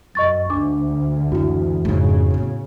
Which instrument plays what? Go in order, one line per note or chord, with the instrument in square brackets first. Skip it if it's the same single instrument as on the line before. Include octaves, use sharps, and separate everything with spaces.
[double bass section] F#2 [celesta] D#5 C#6 A6
[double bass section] D2 [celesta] D4 D6
[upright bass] F#2 E3 [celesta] E4 F#4
[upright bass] F2 G#2 [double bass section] C#3
[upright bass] A2 B3